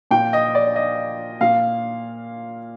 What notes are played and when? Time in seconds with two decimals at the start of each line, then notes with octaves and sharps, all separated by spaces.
0.11 A#2 G5
0.33 D#5
0.55 D5
0.76 D#5
1.41 A#2 F5